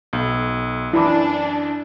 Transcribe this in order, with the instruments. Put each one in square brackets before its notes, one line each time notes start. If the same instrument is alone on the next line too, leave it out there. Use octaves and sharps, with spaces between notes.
[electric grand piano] B1
[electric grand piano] F#2 E3 D6 [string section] D4 [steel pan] E4 B5